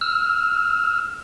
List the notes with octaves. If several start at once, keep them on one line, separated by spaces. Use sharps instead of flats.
E6 F6